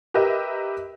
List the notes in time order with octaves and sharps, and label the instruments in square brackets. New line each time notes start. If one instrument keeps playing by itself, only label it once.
[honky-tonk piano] G4 A#4 B4 D#5 E5